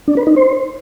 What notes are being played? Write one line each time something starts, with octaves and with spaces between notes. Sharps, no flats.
D4
B4
D#4
C5